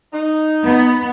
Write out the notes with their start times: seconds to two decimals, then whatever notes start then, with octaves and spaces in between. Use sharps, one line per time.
0.13 D#4
0.66 B3